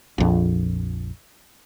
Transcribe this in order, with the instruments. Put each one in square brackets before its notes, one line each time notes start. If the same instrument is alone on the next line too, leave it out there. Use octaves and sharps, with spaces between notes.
[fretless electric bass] A#1 F2